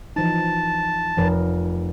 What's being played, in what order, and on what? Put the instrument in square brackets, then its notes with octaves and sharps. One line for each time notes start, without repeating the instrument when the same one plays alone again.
[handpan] E3 F3 D#4 [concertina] A5 [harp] E7
[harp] F1 [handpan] F3 A#4 B4